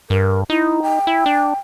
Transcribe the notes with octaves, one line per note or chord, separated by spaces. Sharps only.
G2 A#4
D#4 E4
G5
E4
D4